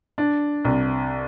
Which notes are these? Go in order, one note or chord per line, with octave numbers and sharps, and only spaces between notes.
D4
C2